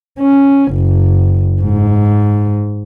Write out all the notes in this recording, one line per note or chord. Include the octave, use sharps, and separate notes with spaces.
C#4
F#1
G#2